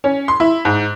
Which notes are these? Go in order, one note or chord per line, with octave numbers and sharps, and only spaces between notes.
C#4
C6
E4
G#2